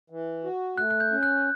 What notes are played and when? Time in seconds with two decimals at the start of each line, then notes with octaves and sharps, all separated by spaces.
0.10 E3
0.44 F#4
0.78 A3 F#6
0.91 F#6
1.00 G6
1.11 C#4
1.23 F#6